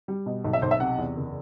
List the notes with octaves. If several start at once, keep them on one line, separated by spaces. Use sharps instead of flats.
G3
B2
B1
E5
B1 C5
E5
C3 F#5
E2
F#1